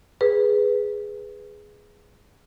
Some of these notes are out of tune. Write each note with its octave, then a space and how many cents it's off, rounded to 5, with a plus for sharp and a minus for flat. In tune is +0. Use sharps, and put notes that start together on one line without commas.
G#4 +0 B4 +0